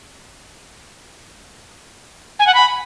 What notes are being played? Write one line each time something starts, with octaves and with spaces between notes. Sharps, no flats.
G#5
F#5
B5